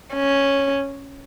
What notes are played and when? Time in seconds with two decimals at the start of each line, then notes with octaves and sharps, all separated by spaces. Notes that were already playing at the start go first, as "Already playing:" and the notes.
0.14 C#4